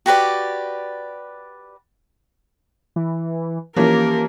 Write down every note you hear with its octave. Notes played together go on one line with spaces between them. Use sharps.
F#4 G4 B4 D5
E3
E3 F3 A#3 C#4 G4 A#4